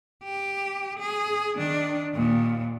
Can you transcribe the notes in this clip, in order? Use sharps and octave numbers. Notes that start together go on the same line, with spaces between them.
G4
G#4
D#3 D4
D#2 A#2